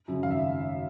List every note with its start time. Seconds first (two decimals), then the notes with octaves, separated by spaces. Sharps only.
0.08 F#2 C#3
0.23 G#1 F5
0.31 E5